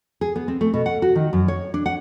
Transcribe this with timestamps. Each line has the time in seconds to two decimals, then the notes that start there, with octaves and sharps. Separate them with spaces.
0.21 G#4
0.36 B3
0.48 C4
0.61 A3
0.74 B2
0.86 F#5
1.02 F#4
1.16 D#3
1.33 F#2
1.48 C#5
1.74 D4
1.86 F#5